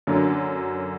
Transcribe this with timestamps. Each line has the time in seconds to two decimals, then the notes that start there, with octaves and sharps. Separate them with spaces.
0.07 F#2 D3 F#3 A#3